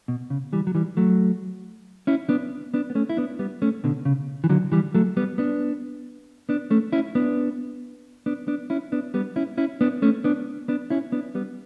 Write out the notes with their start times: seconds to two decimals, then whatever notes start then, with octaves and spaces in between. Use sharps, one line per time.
0.08 B2
0.30 C#3
0.53 E3 G3
0.67 F#3
0.75 E3 G3
0.97 F#3 A3
2.07 C#4 E4
2.29 B3 D4
2.74 B3 D4
2.90 B3
2.95 A3 C#4
3.10 E4
3.17 B3 D4
3.39 G3 B3
3.62 A3 C#4
3.84 B2 D3
4.05 C#3
4.44 E3
4.49 D3 F#3
4.72 E3 G3
4.95 F#3 A3
5.17 G3 B3
5.38 B3 D4
6.49 B3 D4
6.70 A3 C#4
6.93 C#4 E4
7.15 B3 D4
8.26 B3 D4
8.48 B3 D4
8.70 C#4 E4
8.92 B3 D4
9.14 G3 B3
9.36 C#4 E4
9.58 C#4 E4
9.81 B3 D4
10.02 A3 C#4
10.24 B3 D4
10.68 B3 D4
10.90 C#4 E4
11.12 B3 D4
11.35 G3 B3